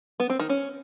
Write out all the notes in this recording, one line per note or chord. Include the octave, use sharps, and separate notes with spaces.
B3
C4
D#3
C#4